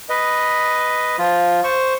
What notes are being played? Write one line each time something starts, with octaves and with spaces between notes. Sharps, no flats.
B4 D#5
F3 F4
C5 C#6